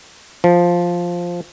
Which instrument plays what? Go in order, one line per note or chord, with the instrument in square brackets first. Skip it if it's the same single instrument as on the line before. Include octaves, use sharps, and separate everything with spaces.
[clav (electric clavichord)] F3